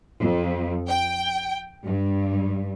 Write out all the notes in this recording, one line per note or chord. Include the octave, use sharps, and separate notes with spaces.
F2
G5
G2